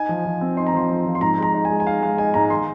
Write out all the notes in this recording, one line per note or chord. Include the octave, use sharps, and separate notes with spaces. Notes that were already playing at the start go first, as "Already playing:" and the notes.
Already playing: D#4 G#5
F3
F3
C4
D#4 C6
A#5
F3 C6
F3
F3
C6
G#2 A#5
G#3 A#5
D#4
G#3 G#5
G#5
D#4 F5
G#3 F5
D#4 G#5
G#2 A#5
D#3 C6